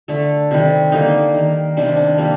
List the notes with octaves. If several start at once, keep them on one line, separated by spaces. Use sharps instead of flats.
D3 A3 A4
C3 D#3 G3
D3 G3 A#3 D#4
D#3 A#3
C3 D#3 G3 D4
D4
C3 G3 A#3